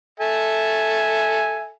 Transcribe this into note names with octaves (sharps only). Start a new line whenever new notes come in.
A4 E5 G#5